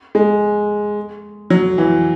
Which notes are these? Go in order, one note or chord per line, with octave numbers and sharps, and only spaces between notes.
G#3
F#3
E3